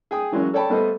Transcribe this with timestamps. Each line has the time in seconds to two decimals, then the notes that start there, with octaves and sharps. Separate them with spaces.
0.11 G#4 G5 D#6
0.32 E3 F#3 G#3 A#3 C#4
0.54 A4 C#5 D5 G5 A5 B5
0.69 G3 A3 B3 A4 C5 D#5